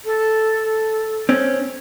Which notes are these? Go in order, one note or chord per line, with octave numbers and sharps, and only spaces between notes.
A4
C4 C#4